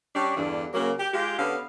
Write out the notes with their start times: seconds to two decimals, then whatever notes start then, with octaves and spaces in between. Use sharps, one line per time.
0.14 G3 C#4 D4
0.36 E2 G2 D3 E3 D4
0.73 C#3 F#3 A#3
0.98 G4
1.13 G#3 F4 G4
1.38 D3 B3 C#4 G4 F5